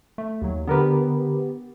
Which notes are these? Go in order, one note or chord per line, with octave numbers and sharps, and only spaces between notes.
A3
D#2 F#3
D3 B3 G4 A#4 B4